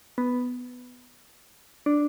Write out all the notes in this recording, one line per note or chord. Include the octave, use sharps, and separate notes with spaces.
B3
D4